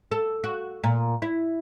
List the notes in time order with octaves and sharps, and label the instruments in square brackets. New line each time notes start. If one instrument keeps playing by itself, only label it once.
[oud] A4
F#4
A#2
E4